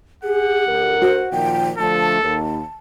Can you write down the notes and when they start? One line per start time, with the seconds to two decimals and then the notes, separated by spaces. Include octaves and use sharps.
0.24 G4 G#4 F#5
0.67 D2 A#4
1.02 F#4 C5
1.31 A#2 D#3 F3 G5
1.78 D3 F3 A3 A4 A5
2.22 D#2 A5